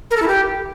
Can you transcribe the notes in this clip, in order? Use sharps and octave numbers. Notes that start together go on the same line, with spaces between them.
A#4
A4
E4
G4